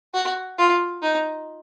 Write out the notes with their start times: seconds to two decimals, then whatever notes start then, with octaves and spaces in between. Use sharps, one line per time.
0.14 F#4
0.58 F4
1.03 D#4